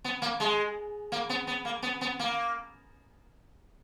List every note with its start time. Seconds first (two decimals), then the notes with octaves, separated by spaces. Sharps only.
0.04 B3
0.22 A#3
0.40 G#3
1.12 A#3
1.29 B3
1.47 B3
1.65 A#3
1.82 B3
2.01 B3
2.19 A#3